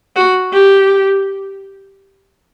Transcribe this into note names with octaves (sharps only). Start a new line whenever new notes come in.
F#4
G4